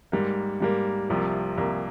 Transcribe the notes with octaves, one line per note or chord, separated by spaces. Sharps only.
G#2 G3 A#3
G#2 G3 A#3
C2 C3 F3 A#3
C2 C3 F3 A#3